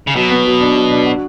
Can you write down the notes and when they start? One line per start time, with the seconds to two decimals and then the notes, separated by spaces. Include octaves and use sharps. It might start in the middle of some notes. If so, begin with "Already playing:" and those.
0.07 C#3
0.15 B2 F#3
0.31 B3
0.45 F#3
0.61 D4
0.76 F#3
0.91 D4
1.06 F#4